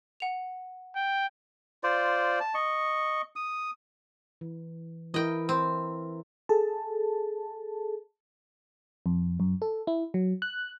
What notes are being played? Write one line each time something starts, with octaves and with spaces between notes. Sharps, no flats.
F#5 F7
G5
F4 C5 D5
A5
D#5 C#6
D#6
E3
E3 E4 A#4 D#5 G5
C4
G#4 A4 A5
F2
F#2
A4
E4
F#3
F#6